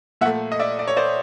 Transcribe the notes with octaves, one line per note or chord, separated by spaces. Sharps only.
A#2 F3 A3 E5 F#5
D#5
D5 E5
D5
C#5
C5 D5